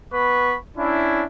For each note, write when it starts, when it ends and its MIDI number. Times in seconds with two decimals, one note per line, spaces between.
0.12 0.56 59
0.12 0.56 71
0.12 0.56 83
0.12 0.56 85
0.76 1.24 61
0.76 1.24 62
0.76 1.24 64